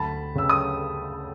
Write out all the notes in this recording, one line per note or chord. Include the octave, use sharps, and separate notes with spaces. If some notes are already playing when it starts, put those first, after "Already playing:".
Already playing: D2 A5 B5
C#3 E6
D#6